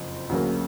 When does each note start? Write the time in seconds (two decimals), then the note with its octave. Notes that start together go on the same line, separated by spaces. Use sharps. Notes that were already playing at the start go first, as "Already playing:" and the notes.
Already playing: F#1 F2 C5
0.29 D2 C#3 F#3 A#3